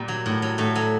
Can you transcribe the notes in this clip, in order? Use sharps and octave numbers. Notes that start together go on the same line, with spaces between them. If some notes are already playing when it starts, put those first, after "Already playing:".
Already playing: A#2 G3
F#3
A2
F#3
A2 A3
F#3